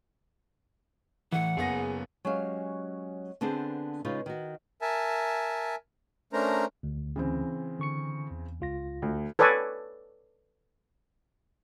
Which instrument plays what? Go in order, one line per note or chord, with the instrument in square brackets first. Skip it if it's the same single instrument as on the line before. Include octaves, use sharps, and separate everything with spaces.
[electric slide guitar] A2 E3 [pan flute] F#5
[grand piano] F#1 B3 A#6 [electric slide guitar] G#4
[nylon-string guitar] F#3 G#3 C#4 G4 F5
D3 B3 C4 D4 G#4 C5
C#3 G#3 D#4 F4 B4
D#3 F#4
[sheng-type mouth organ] A#4 E5 G#5 A5
A3 C#4 D4 A#4 C5 A#5
[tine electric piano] D2
[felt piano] C#3 E3 C4
[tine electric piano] D3 C#6 C#7
E2
C#2 F4 A#6
[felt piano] D2
[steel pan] A4 B4 C#5 D5 G#5